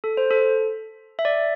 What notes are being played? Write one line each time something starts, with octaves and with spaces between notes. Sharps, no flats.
A4
C5
A4
E5
D5